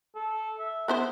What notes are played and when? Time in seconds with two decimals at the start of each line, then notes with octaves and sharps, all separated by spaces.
0.15 A4
0.59 E5
0.88 B3 E4 C5